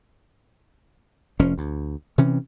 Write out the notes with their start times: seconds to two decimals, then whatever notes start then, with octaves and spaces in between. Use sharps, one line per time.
1.39 F1 F3 C#4
1.58 D2
2.18 C3 E3 C#4